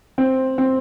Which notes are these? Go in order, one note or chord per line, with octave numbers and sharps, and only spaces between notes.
C4
C4